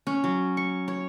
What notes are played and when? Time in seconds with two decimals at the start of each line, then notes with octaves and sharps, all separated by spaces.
0.07 C#4
0.24 F#3
0.57 C#6
0.88 C#5